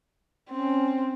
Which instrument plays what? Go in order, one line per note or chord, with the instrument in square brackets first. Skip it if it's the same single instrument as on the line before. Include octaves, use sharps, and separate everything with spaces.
[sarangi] C4 [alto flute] C#4